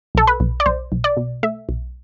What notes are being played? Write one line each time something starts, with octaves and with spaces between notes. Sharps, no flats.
B1 A4
B4
B1
D5
B1 C5
B1
D5
B2
A3 E5
B1